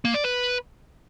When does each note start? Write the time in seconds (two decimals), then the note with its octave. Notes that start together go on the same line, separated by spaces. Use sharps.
0.05 A#3
0.14 D5
0.24 B4